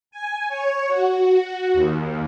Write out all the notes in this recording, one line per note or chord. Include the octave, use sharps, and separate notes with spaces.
G#5
C#5
F#4
D#2